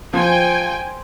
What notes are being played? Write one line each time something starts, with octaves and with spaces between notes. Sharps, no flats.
F3 C5 G5 G#5